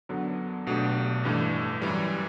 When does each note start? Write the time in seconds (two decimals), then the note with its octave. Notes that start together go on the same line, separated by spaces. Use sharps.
0.09 F#2 D3 F#3 B3
0.66 B1 B2 A3 D4 G4
1.24 A1 G2 E3 A3
1.82 F#2 E3 G3